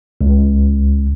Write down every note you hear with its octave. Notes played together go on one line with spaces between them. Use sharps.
C#2